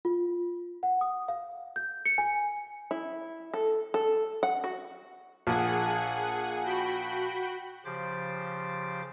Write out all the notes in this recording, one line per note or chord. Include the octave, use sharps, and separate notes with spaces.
F4
F#5
D#6
F5
G6
C#7
G#5
E4
A4
A4
F#5
F#4
A#1 G#4 F#5 G#5
F#4 G5 B5
C#3 F3 G4 C5 D6 A6